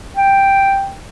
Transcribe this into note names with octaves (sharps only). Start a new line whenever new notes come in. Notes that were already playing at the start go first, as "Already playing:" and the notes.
G5